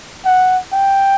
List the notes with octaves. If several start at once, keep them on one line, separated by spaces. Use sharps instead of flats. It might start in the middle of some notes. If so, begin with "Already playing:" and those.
F#5
G5